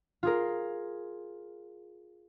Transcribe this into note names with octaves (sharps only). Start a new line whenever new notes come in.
F4 G#4 A#4